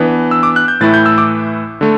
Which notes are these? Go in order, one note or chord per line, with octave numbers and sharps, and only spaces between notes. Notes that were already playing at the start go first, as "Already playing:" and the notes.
Already playing: E3 B3 D4
E6
D6
F#6
G6
A2 E3 A3 E4 A6
G6
E6
D6
D3 A3